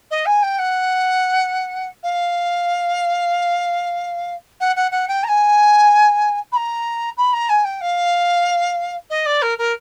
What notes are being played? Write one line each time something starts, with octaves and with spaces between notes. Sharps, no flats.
D#5
G#5
G5
F#5
F5
F#5
F#5
F#5
G5
A#5
G#5
B5
A#5
B5
A#5
G#5
G5
F5
D#5
D5
A#4
A#4